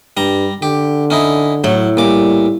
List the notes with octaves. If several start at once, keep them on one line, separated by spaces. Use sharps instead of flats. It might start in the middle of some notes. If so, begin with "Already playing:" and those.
G2 G3 A#5
D3 G4
C#4 D#4 E4
A2 F#3
A#2 G3 D6